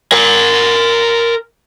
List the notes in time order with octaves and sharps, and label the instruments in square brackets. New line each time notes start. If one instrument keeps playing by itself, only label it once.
[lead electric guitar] A#4 G#5